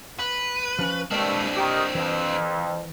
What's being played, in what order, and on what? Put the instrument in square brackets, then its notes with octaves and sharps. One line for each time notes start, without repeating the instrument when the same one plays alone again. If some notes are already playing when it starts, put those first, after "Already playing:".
[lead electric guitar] B4
[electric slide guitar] F3 C#4
[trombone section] G2 A3 [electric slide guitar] G#3 A#4 [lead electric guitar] C4 D4
[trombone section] D#3 [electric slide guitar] G4 G5
[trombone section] F2 [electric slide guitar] E3